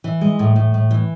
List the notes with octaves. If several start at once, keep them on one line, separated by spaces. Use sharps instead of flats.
E3
G#3
A2
A2
A2
E3